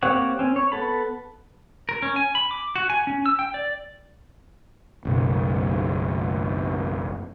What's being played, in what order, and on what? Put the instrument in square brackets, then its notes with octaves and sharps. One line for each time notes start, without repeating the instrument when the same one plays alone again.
[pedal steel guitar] A#3 C4 G4 C#5 F#5
C4 C#4
C#5
B3 A4 B5
A#4
C#4
G#5
B5
D6
F#4
G#5
C#4
E6
G5
D5
[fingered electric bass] F#1 B1